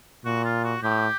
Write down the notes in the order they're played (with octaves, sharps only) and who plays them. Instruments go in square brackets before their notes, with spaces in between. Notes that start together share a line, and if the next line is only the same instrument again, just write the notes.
[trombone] A#2 [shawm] F#4
[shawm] F4
F#4
[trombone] A2 [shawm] G4